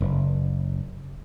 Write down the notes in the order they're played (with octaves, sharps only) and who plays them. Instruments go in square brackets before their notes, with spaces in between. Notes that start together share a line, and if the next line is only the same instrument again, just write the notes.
[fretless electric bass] F#1